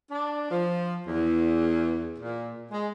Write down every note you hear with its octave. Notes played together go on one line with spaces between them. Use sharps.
D4
F3
E2
A#2
G#3